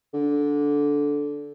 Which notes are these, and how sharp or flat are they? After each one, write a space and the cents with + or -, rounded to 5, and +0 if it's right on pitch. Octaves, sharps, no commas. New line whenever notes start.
D3 -15